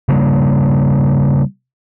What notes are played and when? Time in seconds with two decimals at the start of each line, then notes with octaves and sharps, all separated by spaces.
0.09 C#3 G3 A#3